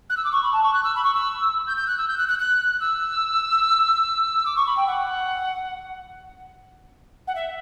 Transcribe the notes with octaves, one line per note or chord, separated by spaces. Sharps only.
F#6
E6
D6
C#6
B5
A5
C#6
F#6
E6
B5
C#6
E6
G6
G6
F#6
E6
G6
F#6
F#6
F#6
E6
D6
C#6
B5
G5
F#5
F#5
E5